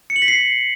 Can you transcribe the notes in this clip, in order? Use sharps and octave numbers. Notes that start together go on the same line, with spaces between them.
C#7
F#7
B6
C7